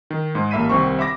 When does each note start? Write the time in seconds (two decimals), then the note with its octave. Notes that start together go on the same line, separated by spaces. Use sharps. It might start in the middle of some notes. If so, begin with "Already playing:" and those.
0.10 D#3
0.35 G#2 G#3
0.51 A1 A#3 E5 B5 B6 D#7
0.69 C2 D#3 C4 C#6
0.99 E5 B5 D6 A#6